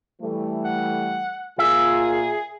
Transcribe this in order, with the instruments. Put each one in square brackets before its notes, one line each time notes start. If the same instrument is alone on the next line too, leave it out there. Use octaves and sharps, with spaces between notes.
[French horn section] E3 G3 A3
[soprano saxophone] F#5
[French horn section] A#2 F4 [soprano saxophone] G#4 [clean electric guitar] E5